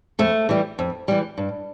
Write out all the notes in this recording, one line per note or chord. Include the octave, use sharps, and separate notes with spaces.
F2 A3
E3 G3
F2
E3 G3
G2